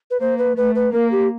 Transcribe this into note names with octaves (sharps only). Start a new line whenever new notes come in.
B4
A#3 C5
B4
A3 B4
B4
A#3 A#4
G4